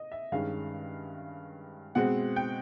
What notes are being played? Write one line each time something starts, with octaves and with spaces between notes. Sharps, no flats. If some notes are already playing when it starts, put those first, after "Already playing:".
Already playing: D#5
E5
G2 D#3 G#3 C#4 F5
B2 G#3 C4 F#5
G5